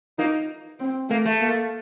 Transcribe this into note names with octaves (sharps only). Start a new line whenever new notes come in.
A#3 D#4
C4
A3 A#3
A3
A#3